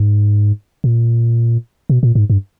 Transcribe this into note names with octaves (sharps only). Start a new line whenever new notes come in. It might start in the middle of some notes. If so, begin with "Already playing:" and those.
Already playing: G#2
A#2
B2
A#2
G#2
G2